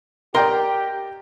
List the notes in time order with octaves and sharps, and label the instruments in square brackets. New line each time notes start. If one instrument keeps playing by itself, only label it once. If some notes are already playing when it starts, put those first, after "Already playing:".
[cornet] G4 [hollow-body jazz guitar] A#4 D#5 C6 [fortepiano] D5 G5 A#5